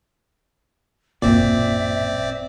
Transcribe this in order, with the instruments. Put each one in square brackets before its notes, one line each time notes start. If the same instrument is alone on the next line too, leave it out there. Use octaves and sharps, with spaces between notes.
[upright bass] A1 F#2 [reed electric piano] A#2 [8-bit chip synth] C4 D5 [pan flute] E5